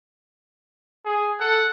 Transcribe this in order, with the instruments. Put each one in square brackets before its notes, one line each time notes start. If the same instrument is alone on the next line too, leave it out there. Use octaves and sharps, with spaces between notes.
[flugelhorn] G#4
[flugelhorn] A4 [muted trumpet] F#5